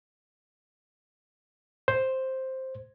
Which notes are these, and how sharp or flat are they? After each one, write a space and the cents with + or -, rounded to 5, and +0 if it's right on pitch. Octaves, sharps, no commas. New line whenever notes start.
C5 +5